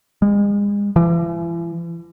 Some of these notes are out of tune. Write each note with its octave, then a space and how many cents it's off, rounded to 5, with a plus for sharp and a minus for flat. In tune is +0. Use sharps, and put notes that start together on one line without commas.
G#3 -35
E3 +40